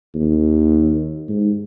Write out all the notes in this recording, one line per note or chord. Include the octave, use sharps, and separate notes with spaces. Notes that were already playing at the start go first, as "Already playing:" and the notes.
D#2
G#2